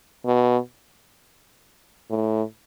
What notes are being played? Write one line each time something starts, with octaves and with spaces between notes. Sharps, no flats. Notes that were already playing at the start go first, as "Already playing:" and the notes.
B2
A2